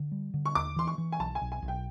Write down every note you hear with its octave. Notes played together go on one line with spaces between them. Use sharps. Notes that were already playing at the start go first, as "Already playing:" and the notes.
Already playing: D3
G3
D3
C#6
D#2 D6
E3 C6
C#6
E3
G#5
B1 A5
G#5
B1
G#5
B1
G5